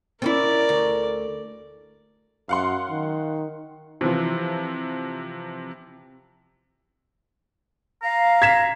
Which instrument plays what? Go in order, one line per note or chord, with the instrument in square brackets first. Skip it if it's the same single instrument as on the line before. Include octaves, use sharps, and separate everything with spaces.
[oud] C4 C#4 E4 [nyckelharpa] A#4 D5
[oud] D2
[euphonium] F#2 [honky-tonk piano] F5 F#5 C6
[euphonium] D#3
[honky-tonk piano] C3 E3 F3
[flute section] F5 [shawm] A#5
[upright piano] G#6 B6 E7